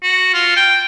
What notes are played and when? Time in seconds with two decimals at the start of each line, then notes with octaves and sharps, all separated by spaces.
0.03 F#4
0.34 F4
0.57 G5